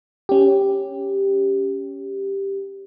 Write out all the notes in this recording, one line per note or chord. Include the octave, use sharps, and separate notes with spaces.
C#4 G4